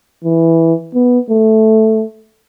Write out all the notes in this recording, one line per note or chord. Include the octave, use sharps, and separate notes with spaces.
E3
B3
A3